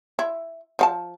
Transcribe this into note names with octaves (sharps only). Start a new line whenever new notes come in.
E4
F3 F5 A5